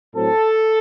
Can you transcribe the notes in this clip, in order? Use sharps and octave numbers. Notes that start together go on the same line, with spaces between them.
A2 F#3 C4 A4